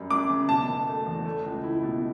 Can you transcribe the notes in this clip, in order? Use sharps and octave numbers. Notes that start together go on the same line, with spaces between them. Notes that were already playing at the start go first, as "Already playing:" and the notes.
Already playing: F#2 G3
F#2 D6
C#3
B2 A5
F#1
A3
E2
A3
C#2
E4
B2